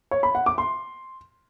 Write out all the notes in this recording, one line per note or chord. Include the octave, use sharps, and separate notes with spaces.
C#5
B5
F#5
D6
C6